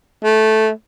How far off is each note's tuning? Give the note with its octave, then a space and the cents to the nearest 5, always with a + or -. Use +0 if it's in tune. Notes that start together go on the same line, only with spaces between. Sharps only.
A3 -10